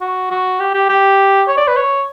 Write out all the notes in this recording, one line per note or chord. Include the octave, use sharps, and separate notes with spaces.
F#4
F#4
G4
G4
G4
C#5
D5
B4
C#5